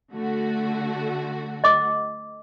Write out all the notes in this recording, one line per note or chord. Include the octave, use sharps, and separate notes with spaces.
D3 A3 F#4
D#5 D6